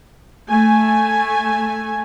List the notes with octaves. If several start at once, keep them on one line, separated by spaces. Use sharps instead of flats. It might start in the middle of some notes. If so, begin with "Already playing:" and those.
A3 G#5